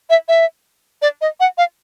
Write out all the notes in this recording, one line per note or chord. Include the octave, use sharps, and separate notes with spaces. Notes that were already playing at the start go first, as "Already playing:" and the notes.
E5
E5
D5
D#5
F#5
F5